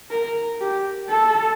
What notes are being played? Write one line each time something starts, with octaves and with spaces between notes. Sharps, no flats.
A#4
G4
A4